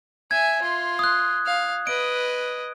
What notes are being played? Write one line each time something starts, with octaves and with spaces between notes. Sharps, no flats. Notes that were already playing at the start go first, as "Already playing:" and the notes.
E5 G#5 G#6
F4 C6
D#6 F#6
F5
B4 D#5 D7